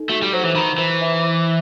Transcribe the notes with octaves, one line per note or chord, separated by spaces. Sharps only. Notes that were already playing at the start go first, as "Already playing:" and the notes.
Already playing: D#4 A4
A3 F#4
G3
F#3 C5
E3
D#3 B5
E3 C5
E5
C5